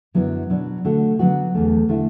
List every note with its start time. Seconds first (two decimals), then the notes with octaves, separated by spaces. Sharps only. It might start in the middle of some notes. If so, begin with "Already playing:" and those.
0.14 F#2 D3 F#3 B3 E4
0.50 B2 F#3 D4
0.85 D3 A3 F#4
1.19 D3 F#3 B3 F#4
1.55 E2 D3 A3
1.89 D3 A3 E4